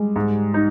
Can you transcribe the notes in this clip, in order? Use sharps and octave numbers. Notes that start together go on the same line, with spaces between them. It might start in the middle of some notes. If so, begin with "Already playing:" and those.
Already playing: G3 G#3
G#2
D#4